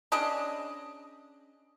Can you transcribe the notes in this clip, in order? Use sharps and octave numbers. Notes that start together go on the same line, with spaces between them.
C#4 D4 G#4 D#5